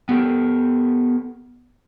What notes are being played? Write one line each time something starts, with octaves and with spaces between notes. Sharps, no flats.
B3 G4 A4 A#4